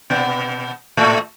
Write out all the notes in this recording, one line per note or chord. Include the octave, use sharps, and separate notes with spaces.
B2 B3
A2 A3